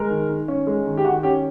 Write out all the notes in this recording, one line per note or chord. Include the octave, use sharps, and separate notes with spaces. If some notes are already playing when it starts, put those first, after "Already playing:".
Already playing: G#3 A#4
D#3
D#3
C#4
G#3
D#3
G4
D#3 F#4
C#4 G4